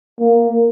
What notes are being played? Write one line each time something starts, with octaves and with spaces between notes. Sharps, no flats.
A#3